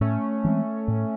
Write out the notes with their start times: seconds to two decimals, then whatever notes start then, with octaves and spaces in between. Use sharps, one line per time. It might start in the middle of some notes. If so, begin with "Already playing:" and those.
0.01 A2 A3 C#4
0.44 E3 G#3 C4
0.88 A2